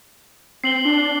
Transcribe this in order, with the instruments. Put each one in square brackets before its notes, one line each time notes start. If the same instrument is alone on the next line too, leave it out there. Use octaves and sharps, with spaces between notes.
[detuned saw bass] C4 [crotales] C7 F#7 G7
[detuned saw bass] D4